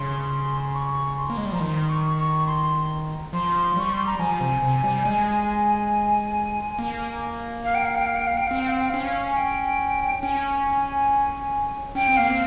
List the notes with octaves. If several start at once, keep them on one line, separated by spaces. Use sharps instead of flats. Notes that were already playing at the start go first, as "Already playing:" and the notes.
Already playing: C#3 C6
C#6
C6
A#3
G#3
G3
F3 A#5
D#3 C6
C#6
C#6
C6
F3 C6
G3 C#6
C6
A#5
F3 G#5
C3
C3
G3
G#3
A#3
F5
G5
F5
G5
F5
G5
F5
G5
C4 F5
G5
F5
G5
C#4 F5
G#5
G5
C#4 G#5
C#4 G5
C4
A#3 F5
C4